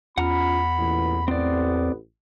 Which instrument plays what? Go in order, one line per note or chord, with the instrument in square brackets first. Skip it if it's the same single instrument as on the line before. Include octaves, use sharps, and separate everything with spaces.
[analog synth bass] E2 [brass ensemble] C#4 F4 [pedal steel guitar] F#5 A#5 F6 [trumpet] B5
[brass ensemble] A1 A#2 E3
[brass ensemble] A1 [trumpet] B3 [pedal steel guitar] C4 D5